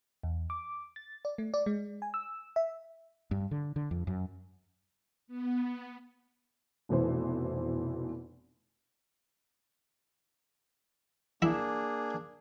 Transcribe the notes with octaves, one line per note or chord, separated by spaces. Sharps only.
E2
D6
A6
D5
A3
D5
G#3
G#5
E6
E5
G2
D3
D3
F2
F#2
B3
F1 B2 E3 C5
A#3 D4 E4 G#4